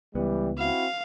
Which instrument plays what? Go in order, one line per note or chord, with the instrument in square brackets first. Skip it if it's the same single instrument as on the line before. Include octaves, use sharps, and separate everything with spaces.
[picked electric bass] C#2 B3 [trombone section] E3 G3
[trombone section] C4 E4 F#4 [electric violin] F5